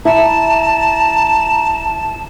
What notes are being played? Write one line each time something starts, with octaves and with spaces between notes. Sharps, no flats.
E4 A5 A#5